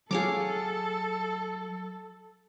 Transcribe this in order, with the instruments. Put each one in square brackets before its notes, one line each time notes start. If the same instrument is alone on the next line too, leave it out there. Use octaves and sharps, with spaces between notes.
[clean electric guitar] F#3 F5 [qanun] G#4 C#5 D6 [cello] A4